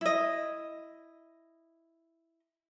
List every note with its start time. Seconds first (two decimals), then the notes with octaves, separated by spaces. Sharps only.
0.01 E4 D#5